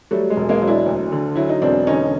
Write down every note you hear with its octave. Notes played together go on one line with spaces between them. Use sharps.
F#3 G3 A3
G#3
E1
G#3 A#3
F#3
D4 E4
D2
D3
F#3 E4
D#4
E1 C4 D4
D3 C#4 D#4